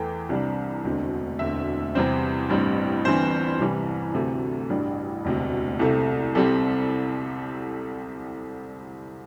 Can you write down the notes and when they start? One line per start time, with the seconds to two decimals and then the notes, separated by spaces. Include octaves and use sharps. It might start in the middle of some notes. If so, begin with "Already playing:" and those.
Already playing: E2 E3 A3 G5
0.29 C2 C3 G3 D4
0.84 E1 D2 D3 C4
1.39 E1 D2 D3 C4 E5
1.95 E2 C3 G3 C4 C5
2.49 A1 G2 G3 C4
3.05 G1 G2 E3 C4 C5
3.60 C2 C3 E3 G3
4.14 D2 C3 E3 A3 A4
4.70 A1 G2 G3 D4
5.25 E1 D2 C3
5.79 C2 C3 A3
6.35 C2 C3 G3 C4 A4